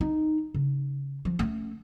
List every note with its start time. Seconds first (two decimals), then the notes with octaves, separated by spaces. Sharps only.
0.01 D#4
0.54 C#3
1.25 F3
1.39 A3 C#4